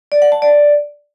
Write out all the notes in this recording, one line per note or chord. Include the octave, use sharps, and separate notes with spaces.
D5
F#5
A5
D5